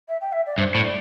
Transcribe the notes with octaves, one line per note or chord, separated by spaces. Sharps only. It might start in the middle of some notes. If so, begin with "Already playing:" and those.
E5
G5
E5
D5
G2 C5
A2
D5